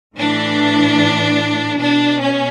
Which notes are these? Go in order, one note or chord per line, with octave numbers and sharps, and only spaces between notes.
A2 E3 D4
B2 D4
C#4